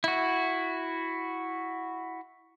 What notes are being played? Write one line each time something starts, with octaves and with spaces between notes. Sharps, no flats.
E4 F#4